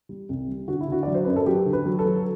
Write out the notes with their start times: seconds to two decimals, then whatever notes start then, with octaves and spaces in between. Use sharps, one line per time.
0.09 G3
0.29 C2
0.48 G3
0.68 D3 F#4
0.81 E4
0.88 D3 F#4
1.03 F#3 D5
1.14 C5
1.24 F#2 B4
1.36 A4
1.47 F#3 G4
1.66 D3
1.73 B4
1.86 F#3
1.99 A4
2.06 F#3